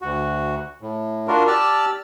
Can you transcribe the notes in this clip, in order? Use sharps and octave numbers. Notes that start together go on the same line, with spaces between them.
D2 F#4
A2
D4 F4 F#4 A#4
G4 D5 A5 E6 F6